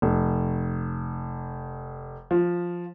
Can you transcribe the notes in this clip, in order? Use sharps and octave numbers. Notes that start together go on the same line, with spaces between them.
F1
F3